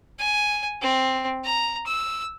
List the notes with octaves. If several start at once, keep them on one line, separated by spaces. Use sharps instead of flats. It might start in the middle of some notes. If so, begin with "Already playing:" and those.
G#5
C4
A#5
E6